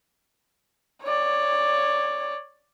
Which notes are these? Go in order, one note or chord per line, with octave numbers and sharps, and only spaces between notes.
C#5 D5